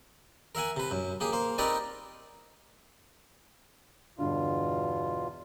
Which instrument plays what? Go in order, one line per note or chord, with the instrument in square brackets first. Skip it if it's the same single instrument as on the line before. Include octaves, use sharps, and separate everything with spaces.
[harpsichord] A#4 E5 F#5 G#5
C3 B4
F#2
A#3 G4 G#4
A#3 C5
C4 D#4 G4 A#4 B4 D5
[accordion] E2 B2 F4 [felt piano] G2 D3